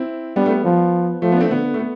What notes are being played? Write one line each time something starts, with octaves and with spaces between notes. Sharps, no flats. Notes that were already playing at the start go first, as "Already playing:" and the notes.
Already playing: C4 E4
G3 B3 D4
A3
B3
F3 B3
F3 A3
B3
D4
A3 C4
D3 B3
A3
B3